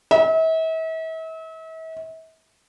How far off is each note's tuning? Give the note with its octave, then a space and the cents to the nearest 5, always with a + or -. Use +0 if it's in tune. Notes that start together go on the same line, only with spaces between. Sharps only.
E5 -40